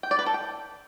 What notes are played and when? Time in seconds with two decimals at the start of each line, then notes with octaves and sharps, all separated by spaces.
0.03 G5
0.11 D5
0.19 B4
0.26 A4
0.34 G5